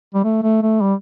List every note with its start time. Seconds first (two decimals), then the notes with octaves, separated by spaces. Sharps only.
0.14 G3
0.24 A3
0.43 A3
0.63 A3
0.81 G3